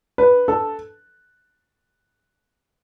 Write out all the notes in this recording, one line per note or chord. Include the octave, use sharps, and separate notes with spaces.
B4
A4